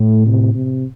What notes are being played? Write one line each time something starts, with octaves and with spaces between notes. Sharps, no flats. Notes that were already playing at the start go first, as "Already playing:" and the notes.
Already playing: A2 A3
C3
C3